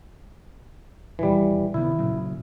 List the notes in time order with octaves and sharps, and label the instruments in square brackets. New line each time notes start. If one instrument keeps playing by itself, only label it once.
[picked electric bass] D#1 [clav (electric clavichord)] E3 G3
[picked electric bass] C3 D#3 B3 [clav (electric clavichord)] E4
[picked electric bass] A#2 C#3 F#3